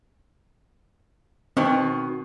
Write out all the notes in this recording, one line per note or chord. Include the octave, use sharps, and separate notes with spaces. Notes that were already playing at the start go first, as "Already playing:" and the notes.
B2 D#3 C4